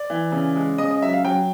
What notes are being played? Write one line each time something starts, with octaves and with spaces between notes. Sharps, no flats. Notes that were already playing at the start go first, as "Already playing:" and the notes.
Already playing: D5
E3
C#3
G#3
C#3 D#5
D#5
F#3 E5
F5
F#3 G5